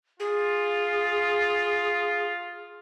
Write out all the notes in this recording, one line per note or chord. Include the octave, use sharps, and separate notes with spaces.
F4 G#4